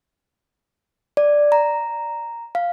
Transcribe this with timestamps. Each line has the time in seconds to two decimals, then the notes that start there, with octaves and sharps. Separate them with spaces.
1.17 D5
1.52 A#5
2.55 F5